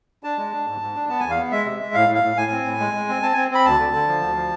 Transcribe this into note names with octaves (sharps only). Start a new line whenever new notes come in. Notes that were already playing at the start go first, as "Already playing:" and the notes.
D4 A5
G#3
D4
G#2
G#2
D4
B3 A5
E2 G#5
F5
B3
G#3 E5
C3
G#3
A2 F5
A2
F5
A2
A2 G#5
C4
A2
G#3
G#3
C4
C4 A5
C4 G#5
C4 B5
D2 A5
D3
D3
F3
D2
F3